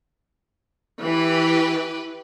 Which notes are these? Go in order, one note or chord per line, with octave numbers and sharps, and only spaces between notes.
E3 G4 B4